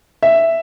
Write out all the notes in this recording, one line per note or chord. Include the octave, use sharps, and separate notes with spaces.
E5